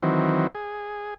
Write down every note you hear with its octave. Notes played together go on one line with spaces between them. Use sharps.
D#3 E3 F#3 C4
G#4